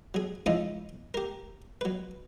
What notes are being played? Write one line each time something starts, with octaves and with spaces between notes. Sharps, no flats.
F#3 G#4
F2 G#2 F3 C#4 E4 D#5
G4 A#4
F#3 B4